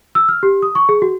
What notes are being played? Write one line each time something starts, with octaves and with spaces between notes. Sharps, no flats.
E6
F6
G4
D#6
C#6
G#4
F#4